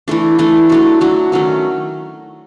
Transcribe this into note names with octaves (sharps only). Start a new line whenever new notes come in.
E3 A3 D4
E3 A3 D4
F#3 A3 D4 F#4
F#3 A3 D4 F#4
D#3 F#3 A3 C#4